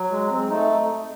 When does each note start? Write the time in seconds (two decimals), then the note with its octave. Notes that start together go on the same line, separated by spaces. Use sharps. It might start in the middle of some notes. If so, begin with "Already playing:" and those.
Already playing: F#3
0.12 G#3
0.31 C4
0.49 A3 D#4